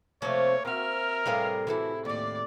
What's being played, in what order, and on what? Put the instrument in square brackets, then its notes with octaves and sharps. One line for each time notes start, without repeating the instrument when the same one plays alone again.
[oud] C3 F3 [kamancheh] A3 [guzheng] A#3 [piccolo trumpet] C#5
[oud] C4 F#4 [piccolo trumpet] A#4 [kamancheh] E5 F6
[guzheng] A2 C3 G#4 [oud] G3 B4 F5
[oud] E3 F#4 A4 [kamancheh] E4
[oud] D#2 A2 [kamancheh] D5